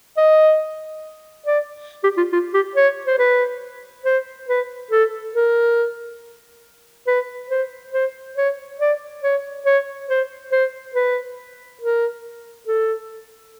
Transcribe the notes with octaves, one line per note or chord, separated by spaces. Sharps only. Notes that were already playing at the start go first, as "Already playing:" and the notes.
D#5
D5
G4
F4
F4
G4
C#5
C5
B4
C5
B4
A4
A#4
B4
C5
C5
C#5
D5
C#5
C#5
C5
C5
B4
A#4
A4